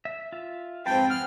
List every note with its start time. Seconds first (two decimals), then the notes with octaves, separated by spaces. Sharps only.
0.05 E5
0.32 F4 E5
0.86 F2 G#2 C4 B4 F5 G5 A5
1.10 G#4 F#5 F6 F#6